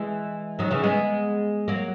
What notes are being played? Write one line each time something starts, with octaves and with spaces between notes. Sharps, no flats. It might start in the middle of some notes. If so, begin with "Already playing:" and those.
Already playing: E3 G#3
D#3 F#3
C#3 E3
G#3 B3
F#3 A#3